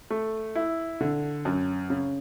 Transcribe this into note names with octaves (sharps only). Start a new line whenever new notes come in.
A3
E4
D3
F#2
C#3